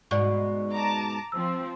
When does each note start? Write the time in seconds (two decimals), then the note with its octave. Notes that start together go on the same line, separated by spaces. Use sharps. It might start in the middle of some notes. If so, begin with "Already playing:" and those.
0.11 G#2 B2 F#4 D5 C#6
0.73 A5 A#5 D6
1.32 F3 C4 E6